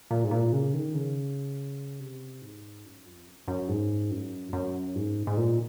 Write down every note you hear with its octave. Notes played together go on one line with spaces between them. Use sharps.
A#2
G#2
A#2
C#3
D#3
C#3
C3
G#2
F#2
F2
F#2
F#2
G#2
F#2
F#2
G#2
G#2
A#2